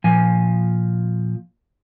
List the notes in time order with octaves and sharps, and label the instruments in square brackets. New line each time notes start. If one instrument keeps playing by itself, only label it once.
[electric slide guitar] A#2 F3 G#5